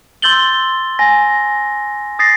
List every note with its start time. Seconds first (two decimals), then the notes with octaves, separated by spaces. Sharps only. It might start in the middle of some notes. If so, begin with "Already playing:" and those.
0.22 C6 E6 G6 A6 F#7 G7
0.99 G#5 A#6
2.19 D#6 A6 A#6 C7